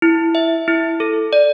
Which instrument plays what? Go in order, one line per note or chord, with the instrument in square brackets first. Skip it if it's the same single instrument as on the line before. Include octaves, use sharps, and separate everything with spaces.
[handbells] E4
E5
E4
A4
D5